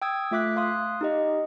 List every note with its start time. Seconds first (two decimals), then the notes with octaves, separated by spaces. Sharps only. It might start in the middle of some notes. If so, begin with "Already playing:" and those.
0.02 G5 D#6 E6 G#6
0.31 A3 F4 E5 D6 F#6 B6
0.56 F5 C6 D#6 F#6
1.01 D#4 G4 D#5